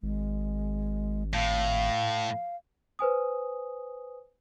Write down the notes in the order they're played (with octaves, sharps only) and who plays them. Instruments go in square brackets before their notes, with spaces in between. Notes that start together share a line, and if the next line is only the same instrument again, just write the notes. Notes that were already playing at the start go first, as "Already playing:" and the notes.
[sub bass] G#1 [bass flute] G#3
[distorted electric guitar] A2 [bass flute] F5
[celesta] B4 C5 G#5 D#6